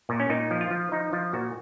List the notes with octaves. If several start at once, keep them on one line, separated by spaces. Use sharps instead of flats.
A#2
C#4
A#2 D#4
F3
F4
F3
F3 D#4
F3 F4
A#2 F#4